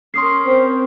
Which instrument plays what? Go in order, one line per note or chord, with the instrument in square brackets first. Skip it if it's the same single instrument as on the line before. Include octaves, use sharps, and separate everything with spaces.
[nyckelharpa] C#4 A#4 [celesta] C6 D#6 C7
[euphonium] C4 [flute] C5